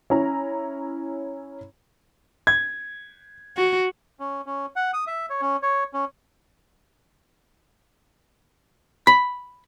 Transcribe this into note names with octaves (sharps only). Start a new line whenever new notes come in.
C#4 E4 A#5
G#6
F#4
C#4
C#4
F#5
D#6
E5
C#5
C#4
C#5
C#4
B5